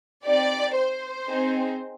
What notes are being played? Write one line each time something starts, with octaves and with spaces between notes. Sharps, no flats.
C4 D#4 G4 D5
C5
C4 D#4 G#4